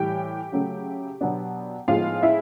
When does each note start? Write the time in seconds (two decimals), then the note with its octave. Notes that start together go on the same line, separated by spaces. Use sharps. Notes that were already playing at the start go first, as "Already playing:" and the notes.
Already playing: A2 E3 G3 G4 G5
0.52 C#3 F#3 A3
1.21 B2 F#3 B3 D4
1.88 A2 F3 G#3 B3 D#4 F4 F5
2.23 E4 E5